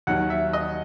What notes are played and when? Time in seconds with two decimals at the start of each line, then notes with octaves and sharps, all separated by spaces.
0.07 D#2 D#3 F#3 F#5
0.30 E5
0.53 D#5